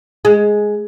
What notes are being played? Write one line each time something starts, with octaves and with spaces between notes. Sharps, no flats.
G#3